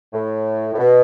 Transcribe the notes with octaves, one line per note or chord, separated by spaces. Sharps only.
A2
A2
B2